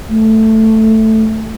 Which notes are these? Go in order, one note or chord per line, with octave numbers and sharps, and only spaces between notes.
A3